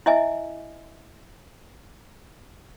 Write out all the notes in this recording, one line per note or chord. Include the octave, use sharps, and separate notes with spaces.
E4 D#5 E5 G#5